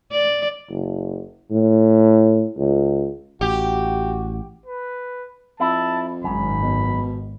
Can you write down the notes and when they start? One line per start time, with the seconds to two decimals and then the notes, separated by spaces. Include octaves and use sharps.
0.12 D5
0.70 F#1
1.51 A2
2.58 C#2
3.41 A1 F#4 G4
4.66 B4
5.60 F2 E4 A5
6.24 G#1 F#2 B5
6.62 B2